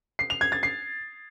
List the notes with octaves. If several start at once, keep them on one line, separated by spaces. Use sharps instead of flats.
C7
F7
G#6
A6
C7